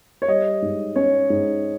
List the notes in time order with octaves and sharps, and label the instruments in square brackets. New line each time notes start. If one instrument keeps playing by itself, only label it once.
[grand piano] C#5
[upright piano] G3 [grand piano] D#5
[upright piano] G#2
[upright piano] C#4 [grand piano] C#5
[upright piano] G#2